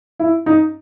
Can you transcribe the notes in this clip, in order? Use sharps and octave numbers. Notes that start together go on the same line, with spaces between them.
E4
D#4